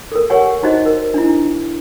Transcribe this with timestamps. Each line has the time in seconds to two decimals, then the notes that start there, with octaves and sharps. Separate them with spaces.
0.12 A4 A#4
0.30 G4 A#4 C#5 F#5 G#5
0.63 D#4 F#4 C5 D#5
0.86 A#4
1.14 D4 E4